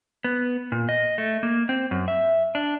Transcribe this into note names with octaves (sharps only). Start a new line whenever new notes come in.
B3
A#2
D#5
A3
A#3
C4
F#2
E5
D4